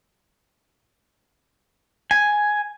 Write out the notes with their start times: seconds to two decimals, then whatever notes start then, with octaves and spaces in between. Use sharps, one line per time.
2.11 G#5